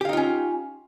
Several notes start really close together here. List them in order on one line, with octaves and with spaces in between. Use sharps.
G4 F5 D#4 F4 C#4